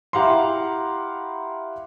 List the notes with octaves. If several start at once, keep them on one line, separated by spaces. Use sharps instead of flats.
E4 G4 F5 F#5 A#5 C6